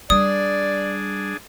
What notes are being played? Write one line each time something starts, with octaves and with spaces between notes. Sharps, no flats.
G3 D4 G#4 D5 D#6